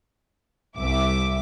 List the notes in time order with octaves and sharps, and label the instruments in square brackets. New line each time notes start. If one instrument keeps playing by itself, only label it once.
[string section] C2 E5 D6